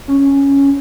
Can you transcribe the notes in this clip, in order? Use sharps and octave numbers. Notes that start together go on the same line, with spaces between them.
C#4